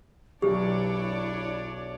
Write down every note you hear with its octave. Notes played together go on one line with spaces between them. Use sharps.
B1 D4 E4 G4 C#5 D5